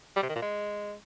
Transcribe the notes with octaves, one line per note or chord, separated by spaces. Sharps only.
G3
C3
D#3
A#2
G#3